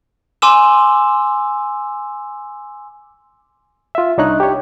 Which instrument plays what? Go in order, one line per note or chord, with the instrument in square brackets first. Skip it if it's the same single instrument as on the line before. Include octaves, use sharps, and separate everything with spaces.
[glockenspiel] G#5 C6 D6 E6 E7
[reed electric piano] F4 E5
C2 D4 D#4 C#5 F#6
G4 C#5